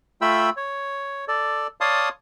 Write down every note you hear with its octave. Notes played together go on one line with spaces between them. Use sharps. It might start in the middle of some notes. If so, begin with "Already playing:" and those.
A3 F4 E5 G5 B5 E6
C#5
A4 D5
C#5 D5 F5 A5 C6 D#6